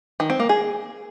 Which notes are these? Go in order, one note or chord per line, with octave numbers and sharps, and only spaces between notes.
D#3
C4
A#3
G#4